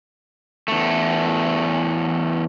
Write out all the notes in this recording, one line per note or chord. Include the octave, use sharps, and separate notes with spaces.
E2 A3